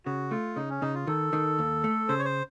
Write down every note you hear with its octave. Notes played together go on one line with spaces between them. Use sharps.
C#3 F#4
A3 F4
C#3 D#4
C#4
C#3 D#4
F4
D#3 A4
D#3
D#2
A3
C#3 C5
C#5
C5